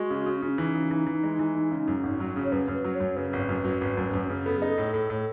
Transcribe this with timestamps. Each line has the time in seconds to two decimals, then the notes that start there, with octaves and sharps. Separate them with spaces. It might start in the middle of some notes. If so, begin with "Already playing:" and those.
Already playing: G#3 F#4
0.10 C#3
0.26 C#3
0.42 C#3
0.49 C#4
0.58 E3 D#4
0.75 C#3
0.91 E3
1.06 E3
1.23 G#3
1.39 E3
1.55 G#3
1.71 C#3
1.88 F#2
2.03 G#1
2.20 F#3
2.36 C#3
2.44 C#5
2.52 F#2 B4
2.68 F#2
2.74 B4
2.84 F#3
2.95 C#5
3.00 F#2
3.16 C#3 B4
3.33 G#1
3.49 F#2
3.65 F#3
3.81 G#1
3.97 F#2
4.13 F#2
4.29 C#3
4.46 B3 A4
4.57 D#4 G#4
4.69 A4
4.78 A2
4.94 A2
5.10 A2